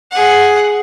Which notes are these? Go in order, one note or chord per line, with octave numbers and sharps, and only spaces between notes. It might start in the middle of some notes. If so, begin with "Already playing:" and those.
G#4 F#5